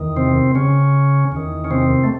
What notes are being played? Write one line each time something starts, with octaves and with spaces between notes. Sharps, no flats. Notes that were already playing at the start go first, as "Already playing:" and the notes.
Already playing: E2 D#3
C3 C4
C#3 C#4
E2 D#3
C#4
C3 C4
A3